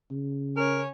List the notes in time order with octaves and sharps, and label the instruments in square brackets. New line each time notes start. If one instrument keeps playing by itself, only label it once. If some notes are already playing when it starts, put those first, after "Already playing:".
[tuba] C#3
[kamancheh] C#4 C#5 [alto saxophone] A#4